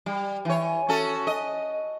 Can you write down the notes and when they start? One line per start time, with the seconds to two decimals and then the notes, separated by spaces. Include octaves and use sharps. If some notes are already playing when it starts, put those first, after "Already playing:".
0.06 G3
0.45 E3 C#5
0.89 C#4 F#4 A4
1.27 D#5